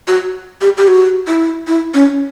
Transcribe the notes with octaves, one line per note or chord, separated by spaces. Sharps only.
F#4
G4
G4
F#4
E4
E4
C#4